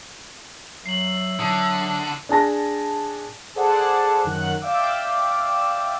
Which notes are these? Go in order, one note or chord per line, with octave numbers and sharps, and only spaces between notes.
F#3 E5 C7 F#7
D3 F#3 D#6
D4 G#4 A5 A#6
G#4 A4 C5 D5 F#5 A5
F#2 D#3 F#5 F#6
D5 E5 F5 G5 D6 E6